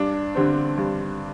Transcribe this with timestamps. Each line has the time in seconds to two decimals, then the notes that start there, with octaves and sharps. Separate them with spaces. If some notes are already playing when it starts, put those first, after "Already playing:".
Already playing: G2 D4
0.35 D3 G3 C4
0.78 G2